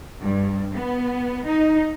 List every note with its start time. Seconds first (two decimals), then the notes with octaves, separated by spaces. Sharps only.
0.22 G2
0.75 B3
1.48 D#4